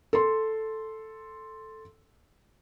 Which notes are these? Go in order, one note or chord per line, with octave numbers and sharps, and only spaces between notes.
A4 C6